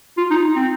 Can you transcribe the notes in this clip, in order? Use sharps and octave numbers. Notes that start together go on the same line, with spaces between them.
F4
D#4
C4